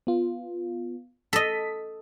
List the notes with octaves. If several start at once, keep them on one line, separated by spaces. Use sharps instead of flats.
B3 F4
A4 D#5 B6